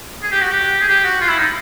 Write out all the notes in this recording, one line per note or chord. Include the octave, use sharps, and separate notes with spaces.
G#4
G4
F#4
G4
G#4
G4
F#4
F4
E4
D#4